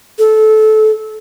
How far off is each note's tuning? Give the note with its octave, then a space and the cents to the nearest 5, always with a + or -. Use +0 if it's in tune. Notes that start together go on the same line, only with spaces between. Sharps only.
A4 -20